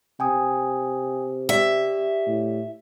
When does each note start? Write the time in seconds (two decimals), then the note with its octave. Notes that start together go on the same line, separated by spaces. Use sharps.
0.20 C3 G5 G#5 D#6
1.49 G4 D5 E5
2.27 A2